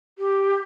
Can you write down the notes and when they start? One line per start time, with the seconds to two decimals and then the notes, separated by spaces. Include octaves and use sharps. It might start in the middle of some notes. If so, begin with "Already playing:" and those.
0.19 G4